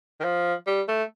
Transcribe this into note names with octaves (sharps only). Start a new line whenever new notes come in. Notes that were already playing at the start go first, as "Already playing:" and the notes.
D#3
F3
G3
A3